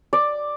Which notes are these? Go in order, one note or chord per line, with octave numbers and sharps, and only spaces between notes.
D5